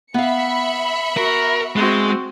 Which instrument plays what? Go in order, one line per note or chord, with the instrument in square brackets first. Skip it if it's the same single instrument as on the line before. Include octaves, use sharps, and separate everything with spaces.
[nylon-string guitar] B3 F5 [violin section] E5 B5 C#7
[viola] F#4 [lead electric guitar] A#4
[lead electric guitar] G#3 [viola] C4 F#4